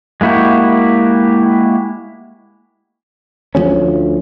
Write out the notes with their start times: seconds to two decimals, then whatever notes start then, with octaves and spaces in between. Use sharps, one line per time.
0.21 G#3 A#3 E4 F#4 G4
3.55 D2 F3 G#3 C#4